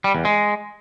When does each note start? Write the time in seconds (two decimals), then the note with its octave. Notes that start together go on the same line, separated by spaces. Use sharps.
0.04 G3
0.15 E2
0.25 G#3